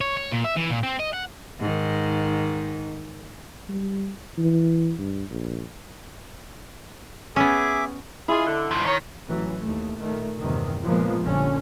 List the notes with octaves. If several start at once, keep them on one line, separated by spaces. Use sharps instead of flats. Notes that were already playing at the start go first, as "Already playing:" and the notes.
C#5
C#5
A#2
E5
E3
A#2
C4
D#5
F#5
G#2 D#3
G3
E3
G2
A#1
B3 C#4 G#4 E5 D6
E4 F4 G#4
D3
G2 F3
D#3 D#4 A#4 C#5
A1 E3 F#3
D#2 A3
A#2 D#3 A3
E2 G2 C3 D#3
A#2 C#3 F3 G#3 A#3 B3
A#1 G2 D3 C#4